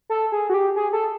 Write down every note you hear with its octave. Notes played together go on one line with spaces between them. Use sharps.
A4
G#4
F#4
G4
G#4
A4